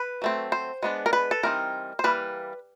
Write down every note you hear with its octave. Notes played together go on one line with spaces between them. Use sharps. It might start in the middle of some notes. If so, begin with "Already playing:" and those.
Already playing: B4
F#3 A3 C4
C5
G#3 B3 D4
A#4
B4
A4
E3 G3 C4 D#4 A#4
C5
E3 G3 A#3 B4